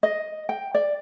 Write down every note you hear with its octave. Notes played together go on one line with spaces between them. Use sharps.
D#5
G5
D5